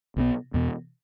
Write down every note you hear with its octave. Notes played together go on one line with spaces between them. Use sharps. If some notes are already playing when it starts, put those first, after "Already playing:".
B1 B2 B3
E2 B2 B3